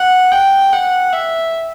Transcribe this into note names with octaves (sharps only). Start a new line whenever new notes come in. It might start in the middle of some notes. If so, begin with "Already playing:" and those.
Already playing: F#5
G5
F#5
E5